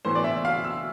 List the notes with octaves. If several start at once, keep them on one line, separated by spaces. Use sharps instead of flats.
A2 E3 B3 C5
D5
E5
F5
E6